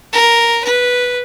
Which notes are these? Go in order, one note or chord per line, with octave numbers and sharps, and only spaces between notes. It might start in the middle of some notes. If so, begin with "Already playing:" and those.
A#4
B4